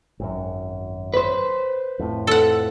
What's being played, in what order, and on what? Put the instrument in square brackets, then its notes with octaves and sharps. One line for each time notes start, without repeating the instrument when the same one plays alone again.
[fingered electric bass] G#1 F#2
[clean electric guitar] B4 C5
[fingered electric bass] F2 A2
[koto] A4 F#5